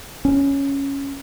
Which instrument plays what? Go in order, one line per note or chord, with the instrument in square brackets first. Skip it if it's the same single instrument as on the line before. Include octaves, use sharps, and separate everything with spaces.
[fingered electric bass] C#4